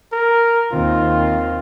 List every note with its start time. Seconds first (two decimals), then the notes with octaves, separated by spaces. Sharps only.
0.13 A#4
0.72 D#2 D#3 C4 F4